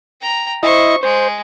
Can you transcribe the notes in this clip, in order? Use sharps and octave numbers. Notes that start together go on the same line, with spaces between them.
G5 A#5
E4 C5 D#5 C#6
G#3 C5